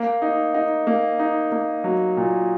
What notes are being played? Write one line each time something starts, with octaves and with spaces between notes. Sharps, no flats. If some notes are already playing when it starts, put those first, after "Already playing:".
Already playing: A#3
D#4
D#4
A#3
D#4
A#3
F#3
A#2